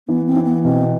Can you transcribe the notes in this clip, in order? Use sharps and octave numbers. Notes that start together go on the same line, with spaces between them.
E3 B3
C4
E3
B3
B2 C4